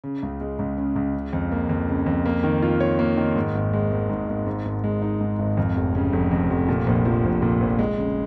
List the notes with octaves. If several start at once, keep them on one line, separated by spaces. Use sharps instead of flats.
C#3
C#2
G#3
C#2
C#3
C#2
C#3
F2
A#3
F2
C#3
F2
A#3
D#3
F4
C#5
A#3
D#3
G#2
G#1
G#3
G#1
G#2
G#1
G#2
G#1
G#3
D#4
G#2
G#1
F2
F1
C#3
F1
F2
F1
A#2
A#1
F3
A#1
A#2
A#1
G#3
C#3